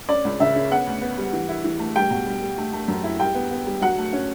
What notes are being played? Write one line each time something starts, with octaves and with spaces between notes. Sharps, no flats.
C#4 D5
C#2
C#3 E5
C#4
B3 F#5
D2
B3
G3
E3
E4
E3
A3
G3 G5
B2
G3
G3
A3
A3
F#2
E4
G3 G5
B3
B3
G3
F#3 F#5
A3
C#4